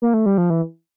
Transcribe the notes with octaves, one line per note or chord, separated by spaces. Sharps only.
A#3
A3
G3
F3
E3